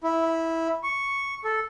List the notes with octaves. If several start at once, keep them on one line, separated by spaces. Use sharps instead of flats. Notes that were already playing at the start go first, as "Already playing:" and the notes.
E4
C#6
A4